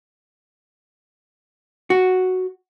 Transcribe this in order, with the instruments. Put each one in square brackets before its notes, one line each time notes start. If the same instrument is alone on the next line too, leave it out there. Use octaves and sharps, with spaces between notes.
[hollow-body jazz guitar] F#4